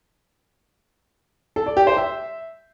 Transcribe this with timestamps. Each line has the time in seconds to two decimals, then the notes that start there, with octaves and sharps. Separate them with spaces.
1.56 A4
1.66 D5
1.77 G4
1.87 C5
1.97 E5